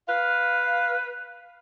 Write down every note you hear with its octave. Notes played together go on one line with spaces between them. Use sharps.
B4 F5